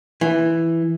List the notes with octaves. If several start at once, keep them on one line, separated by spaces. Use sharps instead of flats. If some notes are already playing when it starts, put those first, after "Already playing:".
E3